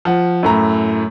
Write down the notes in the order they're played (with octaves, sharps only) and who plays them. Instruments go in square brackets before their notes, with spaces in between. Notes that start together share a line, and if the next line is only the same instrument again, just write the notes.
[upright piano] F3 F#5
F#2 A2 A#5